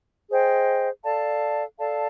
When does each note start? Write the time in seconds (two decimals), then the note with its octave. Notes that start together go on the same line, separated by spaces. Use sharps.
0.29 G#4 C5 D#5 G5
1.04 A4 D5 F5 A5
1.79 A4 D5 F5 A5